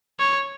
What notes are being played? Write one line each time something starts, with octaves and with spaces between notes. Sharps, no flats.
C#5